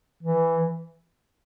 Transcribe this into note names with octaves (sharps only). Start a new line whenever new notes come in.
E3